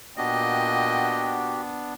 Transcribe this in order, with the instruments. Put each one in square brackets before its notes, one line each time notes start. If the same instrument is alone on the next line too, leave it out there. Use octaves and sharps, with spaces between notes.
[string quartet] A#2 G5 [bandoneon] B3 D4 [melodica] F#4 G4 [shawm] D#5